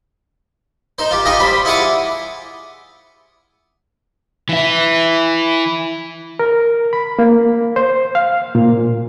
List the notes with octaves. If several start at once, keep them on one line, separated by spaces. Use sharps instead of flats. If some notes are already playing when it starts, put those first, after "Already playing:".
D#4 C5
F4 G4
D#4 F4 G4 G#4 D#5
G3 C5 B5
E4 F4 G#4 F#5 D6 D#6
E3 E4
A#4
B5
A#3
C5
F5
A#2